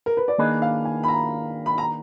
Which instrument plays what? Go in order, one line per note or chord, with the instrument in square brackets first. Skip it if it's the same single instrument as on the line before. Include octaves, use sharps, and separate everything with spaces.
[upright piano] A#4
B4
D5
[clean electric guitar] D#3 A#3 D4 G#4 B4 [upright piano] D#5
[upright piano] F5
G#5
B5
A#5
B5
A#5